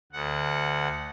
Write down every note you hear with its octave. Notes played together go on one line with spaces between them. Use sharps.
D2 F#5